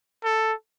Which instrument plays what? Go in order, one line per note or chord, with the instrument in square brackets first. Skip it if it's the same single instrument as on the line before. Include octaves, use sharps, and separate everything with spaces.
[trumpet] A4